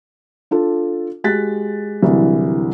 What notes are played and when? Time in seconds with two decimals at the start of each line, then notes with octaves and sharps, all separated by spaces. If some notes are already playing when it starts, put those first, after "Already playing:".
0.51 D4 F4 A4
1.24 G#3 F#4 G4 F#6 A6 B6
2.03 C2 D3 E3 F#3